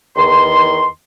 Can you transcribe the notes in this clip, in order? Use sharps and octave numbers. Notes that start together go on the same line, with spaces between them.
E2 D#3 C6